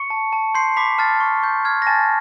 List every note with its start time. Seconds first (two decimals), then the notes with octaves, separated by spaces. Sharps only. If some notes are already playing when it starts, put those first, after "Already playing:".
Already playing: C#6 C#7
0.10 A5
0.33 A5
0.55 C6 G6 C7
0.77 B5 D6 B6
0.98 A5 F6 A6
1.20 C#6
1.42 C#6 G6
1.65 F6 G#6
1.82 A#6
1.87 G#5 A5 A6